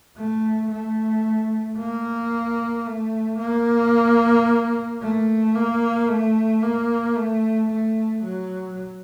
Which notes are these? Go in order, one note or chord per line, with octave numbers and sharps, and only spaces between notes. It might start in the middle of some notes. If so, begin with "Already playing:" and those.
A3
A3
A#3
A3
A#3
A3
A#3
A3
A#3
A3
A3
F#3